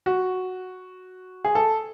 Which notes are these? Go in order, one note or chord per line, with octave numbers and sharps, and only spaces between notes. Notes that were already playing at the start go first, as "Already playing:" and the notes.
F#4
G#4
A4